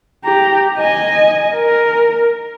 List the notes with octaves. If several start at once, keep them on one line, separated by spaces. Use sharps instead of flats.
G4 A#5
D#5 G#5
A#4